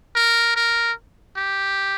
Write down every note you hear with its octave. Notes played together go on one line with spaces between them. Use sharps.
A#4
A#4
G4